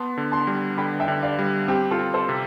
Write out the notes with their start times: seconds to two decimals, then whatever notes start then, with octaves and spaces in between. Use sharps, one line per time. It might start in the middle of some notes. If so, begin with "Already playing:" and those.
Already playing: B3 A5 C6
0.18 D3
0.32 A5 C6
0.47 G3
0.78 D3 G5 B5
1.00 E5 G5
1.08 D3
1.23 D5 F5
1.39 G3
1.68 C4 G4
1.91 F4 A4
1.99 C4
2.14 A4 C5
2.29 C3